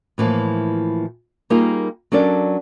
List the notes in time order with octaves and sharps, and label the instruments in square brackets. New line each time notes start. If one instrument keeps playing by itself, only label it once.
[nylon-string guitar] A2 E3 F3 A#3
G3 A#3 D#4 F4 G#4 A#4
F#3 C#4 D4 A4 A#4 D5